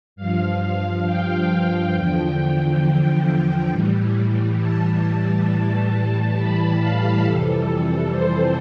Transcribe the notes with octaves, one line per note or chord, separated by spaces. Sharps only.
G2 F3 F5
G5
E2 D3 F3
A2 E3 G3
A5
A2 E3 G3
B5
F5
F2 C3 E3 G3 A4
C5